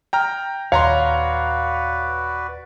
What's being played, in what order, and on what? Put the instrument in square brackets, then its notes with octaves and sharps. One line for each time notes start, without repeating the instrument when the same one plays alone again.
[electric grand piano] G5 A#5 F6
[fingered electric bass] D#1 [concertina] F#4 B4 D5 [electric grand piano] C#5 A#5 C6 [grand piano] F5